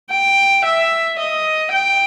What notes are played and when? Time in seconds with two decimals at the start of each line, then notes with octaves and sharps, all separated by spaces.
0.11 G5
0.65 E5
1.19 D#5
1.73 G5